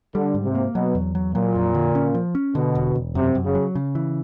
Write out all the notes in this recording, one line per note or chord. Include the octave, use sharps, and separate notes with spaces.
D3 G3
G#2
C3
A#3
B2 F#3
E2
F#3
A#2 F#3
F2
D3
C#4
F3
C#4
B2 D3
E1
E1
F#2 C3
F#2
C#3
F#3
C#3
E3